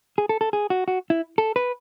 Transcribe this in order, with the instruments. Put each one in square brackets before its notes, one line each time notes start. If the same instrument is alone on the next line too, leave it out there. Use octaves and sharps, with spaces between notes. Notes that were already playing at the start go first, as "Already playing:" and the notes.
[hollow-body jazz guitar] G#4
A4
A4
G#4
F#4
F#4
E4
A4
B4